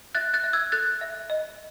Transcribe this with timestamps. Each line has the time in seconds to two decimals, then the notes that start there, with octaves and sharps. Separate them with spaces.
0.15 E5 F#6 A6
0.34 F#6 A6
0.43 E5
0.53 E6 G#6
0.72 A4 F#6 A6
1.01 E5
1.30 D#5